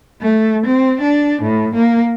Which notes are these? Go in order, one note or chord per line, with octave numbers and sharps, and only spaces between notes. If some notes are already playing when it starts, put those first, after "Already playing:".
A3
C4
D4
A2
A#3